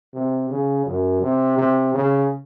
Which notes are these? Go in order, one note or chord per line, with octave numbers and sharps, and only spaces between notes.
C3
C#3
F#2
C3
C3
C#3